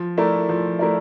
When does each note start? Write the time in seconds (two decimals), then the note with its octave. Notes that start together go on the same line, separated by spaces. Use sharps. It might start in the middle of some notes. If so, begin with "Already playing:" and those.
Already playing: F3
0.18 A3 E4 A#4 D5
0.49 F3
0.79 A3 E4 A#4 D5